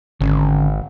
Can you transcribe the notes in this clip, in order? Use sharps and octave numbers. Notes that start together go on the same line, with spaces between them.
G#1 D3 C#4